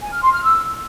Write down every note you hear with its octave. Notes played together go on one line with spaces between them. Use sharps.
G#5
F6
C6
F6
E6